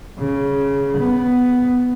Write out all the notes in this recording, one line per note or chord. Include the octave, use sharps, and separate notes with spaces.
C#3
B3